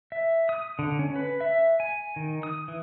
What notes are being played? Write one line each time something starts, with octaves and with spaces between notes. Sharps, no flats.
E5
D#6
D3
C#4
B4
E5
G#5
D#3
D#6
E3